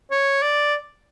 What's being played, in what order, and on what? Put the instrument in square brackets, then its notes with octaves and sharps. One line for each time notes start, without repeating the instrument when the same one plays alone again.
[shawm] C#5
D5